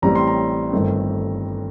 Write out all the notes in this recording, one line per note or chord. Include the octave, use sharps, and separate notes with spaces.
A1 A2 G3 C4 A#5
C6
A#5
G1 G2 D#3 A3 C4